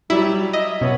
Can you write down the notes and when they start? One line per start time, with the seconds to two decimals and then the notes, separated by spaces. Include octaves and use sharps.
0.10 F#3 G3 E4
0.53 D#5 E5
0.81 G2 B2 B3 C#4 C#5